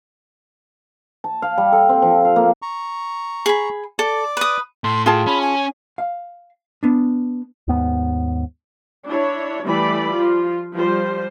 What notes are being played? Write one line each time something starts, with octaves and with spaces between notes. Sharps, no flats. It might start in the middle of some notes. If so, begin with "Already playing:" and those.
A5
F5
G3
A4
C4
F3
F5
A#3
A#5 C#6
G#4 B5
A4 D5 D6
B4 D#6
A2 A4 C6
F4 G#4 G5 A5
C#4 B5
G#5
F5
B3 D4
D#2 G#2 B3
D4 E4 C#5
E3 G3 A3 D5 B5
F3 F4
F3 G3 F4 C5